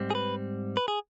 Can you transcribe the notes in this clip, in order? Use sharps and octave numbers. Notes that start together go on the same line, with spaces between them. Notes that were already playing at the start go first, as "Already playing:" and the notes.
Already playing: G#2 G3 C4
G#4
B4
B4
G#4